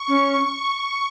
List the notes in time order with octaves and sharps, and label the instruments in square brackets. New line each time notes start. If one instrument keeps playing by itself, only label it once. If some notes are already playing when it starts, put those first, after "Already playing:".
Already playing: [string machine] C#6
[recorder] C#4